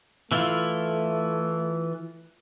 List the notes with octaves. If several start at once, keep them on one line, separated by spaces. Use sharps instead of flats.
E3 A3 E4 F4